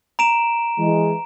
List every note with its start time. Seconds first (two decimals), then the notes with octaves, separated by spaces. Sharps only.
0.19 A#5 D7 E7
0.79 E3 G#3